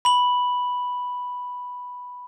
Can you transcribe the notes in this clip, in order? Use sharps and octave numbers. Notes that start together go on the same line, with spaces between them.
B5 F#7